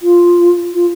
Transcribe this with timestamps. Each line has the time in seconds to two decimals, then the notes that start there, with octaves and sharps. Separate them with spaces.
0.02 F4
0.74 F4